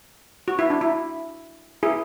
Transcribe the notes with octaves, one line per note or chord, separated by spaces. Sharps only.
F#4
E4
D4
E4
E4 G#4